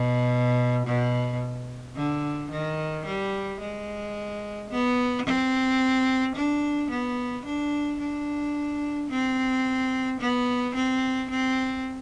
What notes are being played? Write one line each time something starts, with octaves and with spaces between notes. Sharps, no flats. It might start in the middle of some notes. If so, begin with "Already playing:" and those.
Already playing: B2
B2
D3
D#3
G3
G#3
B3
C4
D4
B3
D4
D4
C4
B3
C4
C4